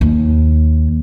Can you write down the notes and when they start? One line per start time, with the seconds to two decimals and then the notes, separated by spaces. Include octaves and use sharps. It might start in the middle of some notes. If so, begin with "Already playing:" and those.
0.01 D#2